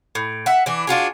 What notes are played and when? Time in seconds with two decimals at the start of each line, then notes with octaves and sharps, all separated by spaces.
0.15 A2
0.46 E5 F#5
0.66 E3 D4
0.87 D4 F4 F#4 G#4